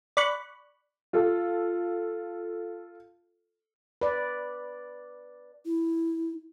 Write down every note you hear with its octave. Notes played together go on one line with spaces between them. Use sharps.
D5 B5 C#6 F#6
F4 A4
B4 D5
E4